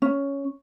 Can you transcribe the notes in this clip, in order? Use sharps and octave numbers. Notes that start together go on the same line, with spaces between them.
C#4